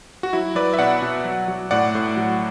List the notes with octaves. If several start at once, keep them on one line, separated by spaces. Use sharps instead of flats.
F#4
F#3 E4
F#3 B4 D5
E5
B2 D5 F#5
B2
F#3
F#3
A2 D5 F#5
A2
F#3